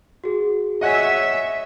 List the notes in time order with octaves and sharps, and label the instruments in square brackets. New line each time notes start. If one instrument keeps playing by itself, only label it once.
[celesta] F#4 G#4
[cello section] C#5 E5 [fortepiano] D#5 F#5 G#5